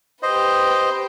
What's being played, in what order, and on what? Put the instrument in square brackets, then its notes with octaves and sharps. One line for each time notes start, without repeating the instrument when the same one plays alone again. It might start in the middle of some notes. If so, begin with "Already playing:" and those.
[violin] G4 B4 [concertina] C5 D#5